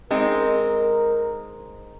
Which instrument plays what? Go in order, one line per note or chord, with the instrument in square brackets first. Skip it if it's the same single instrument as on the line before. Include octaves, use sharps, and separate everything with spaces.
[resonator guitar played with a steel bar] G#3 C4 D#4 [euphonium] A#4